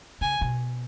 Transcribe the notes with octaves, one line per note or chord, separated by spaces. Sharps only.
C#3 G#5
B2